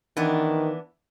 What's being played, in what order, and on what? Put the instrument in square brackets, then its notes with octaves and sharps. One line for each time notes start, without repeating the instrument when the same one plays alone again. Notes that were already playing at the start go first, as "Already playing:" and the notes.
[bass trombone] D#3 [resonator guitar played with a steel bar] E3 B3 D4